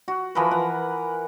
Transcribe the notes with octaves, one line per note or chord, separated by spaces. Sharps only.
F#4
E3 F3 A#4 B4
F#5